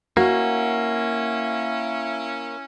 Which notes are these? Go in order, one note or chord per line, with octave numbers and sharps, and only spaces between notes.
A#3 C#4 E4 F#4 F#5